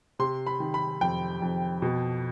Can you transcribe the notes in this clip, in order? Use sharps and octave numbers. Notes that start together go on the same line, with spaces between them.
C3 C6
B5
D#3
B5
F2 G5
F2
B2